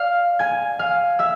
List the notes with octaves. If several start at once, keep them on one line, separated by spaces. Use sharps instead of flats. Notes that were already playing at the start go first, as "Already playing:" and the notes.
Already playing: D5 F5 F6
G#5 G#6
F5 F6
E5 E6